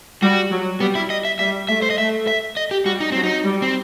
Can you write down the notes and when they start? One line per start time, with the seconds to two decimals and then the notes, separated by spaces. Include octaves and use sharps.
0.23 G3 F#4
0.51 F#3
0.80 G3 B3
0.95 E4
1.10 D#5
1.25 E5
1.39 G3 E5
1.69 A3 E5
1.82 C5
1.90 D#5
1.98 A3 E5
2.27 E5
2.57 D#5
2.71 G4
2.86 G3 F#4
3.00 D#4
3.12 F#3 C4
3.23 D#4
3.45 G3
3.62 C4